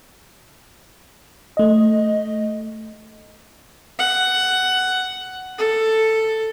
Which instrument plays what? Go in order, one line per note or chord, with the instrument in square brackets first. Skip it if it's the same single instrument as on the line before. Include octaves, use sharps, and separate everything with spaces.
[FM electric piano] A3 D#5
[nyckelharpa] F#5
A4